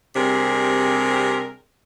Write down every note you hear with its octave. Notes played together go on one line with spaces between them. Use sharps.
C3 G3 C4 D4 G#4 A#4